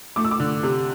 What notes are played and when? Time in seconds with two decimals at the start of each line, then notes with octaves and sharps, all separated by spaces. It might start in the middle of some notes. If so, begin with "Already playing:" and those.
0.16 A3 D6
0.25 E6
0.31 D6
0.40 D3
0.63 C3